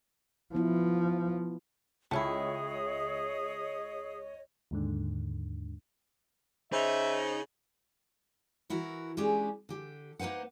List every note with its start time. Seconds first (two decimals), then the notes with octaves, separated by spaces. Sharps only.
0.55 F3 B3 E4
2.11 C#2 A3 C#4 E4 G#4 C#5 D#5
4.71 D#2 G#2 D3
6.72 C#3 D#4 C5 E5
8.70 E3 E4 F#4 A#4
9.17 G#3 C#4 D4 E4 G4 G#4
9.69 D3 G4
10.19 A#3 D#4 B4 C5 F#5